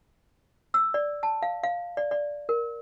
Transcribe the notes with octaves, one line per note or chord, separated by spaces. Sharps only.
E6
D5
A5
F5
F5
D5
D5
A#4